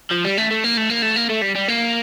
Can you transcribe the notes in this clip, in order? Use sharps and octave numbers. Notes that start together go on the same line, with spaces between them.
F3
G3
A3
A3
A#3
A3
A#3
A3
A#3
A3
G3
G3
A#3